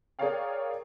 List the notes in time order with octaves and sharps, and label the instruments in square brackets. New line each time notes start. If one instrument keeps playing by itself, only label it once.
[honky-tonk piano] G#4 A#4 C#5 D5 F5 G5